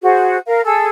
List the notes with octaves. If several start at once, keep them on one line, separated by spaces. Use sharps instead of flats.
F#4 G#4 C5
A#4 F5
G#4 A4 E6